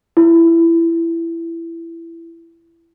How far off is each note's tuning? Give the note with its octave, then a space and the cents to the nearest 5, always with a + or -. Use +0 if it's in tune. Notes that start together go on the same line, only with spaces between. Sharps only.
E4 +15